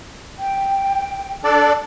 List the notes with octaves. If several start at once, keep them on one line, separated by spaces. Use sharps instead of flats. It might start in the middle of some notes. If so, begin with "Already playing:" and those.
G5
D4 A4 D5